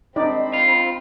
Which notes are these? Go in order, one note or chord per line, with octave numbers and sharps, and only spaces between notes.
C4 D4 D#4 D5 B5
F4